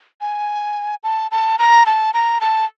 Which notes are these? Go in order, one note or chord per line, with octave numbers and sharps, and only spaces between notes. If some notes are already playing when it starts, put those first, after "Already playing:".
G#5
A5
A5
A#5
A5
A#5
A5